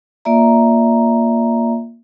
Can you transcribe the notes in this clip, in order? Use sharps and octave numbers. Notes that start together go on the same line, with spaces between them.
A#3 F4 D5 E5 A#5